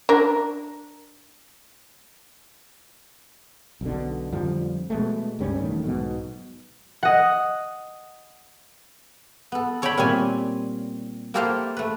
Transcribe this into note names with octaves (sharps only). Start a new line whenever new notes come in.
D4 A#4
B1 B2 D3
F2 D3 F3 G3
B2 G#3 A3
C#2 G2 G3 C#4
E1 E2 D#3 A3
B1 G#2 B2
D#5 F#5
B3 A4
A4 C#5 D5 E5 G5 B5
A#2 G3 C4 C#5 G#5
A#3 E4 G4 A4 C5 F5
A3 B4